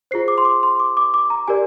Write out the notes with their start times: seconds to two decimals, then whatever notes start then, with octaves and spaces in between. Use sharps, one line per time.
0.11 F4 G#4 C5 C7
0.28 D6
0.38 C6
0.45 D6
0.63 C6
0.80 D6
0.97 D6
1.14 D6
1.30 A#5
1.48 G4 A#4 D5 G#5